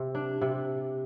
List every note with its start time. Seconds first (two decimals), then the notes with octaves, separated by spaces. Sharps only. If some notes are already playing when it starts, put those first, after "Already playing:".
Already playing: C3
0.15 D4
0.41 C3